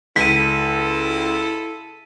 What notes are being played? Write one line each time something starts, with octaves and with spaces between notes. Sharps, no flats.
C#2 E4 A4 B6 D#7